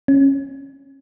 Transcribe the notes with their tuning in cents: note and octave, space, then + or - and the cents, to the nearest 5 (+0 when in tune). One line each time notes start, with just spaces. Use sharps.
C#4 -20